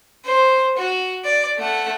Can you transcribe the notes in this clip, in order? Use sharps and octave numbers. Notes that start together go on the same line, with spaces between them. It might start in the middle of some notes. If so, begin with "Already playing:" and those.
C5
F#4
D5
A3 F#5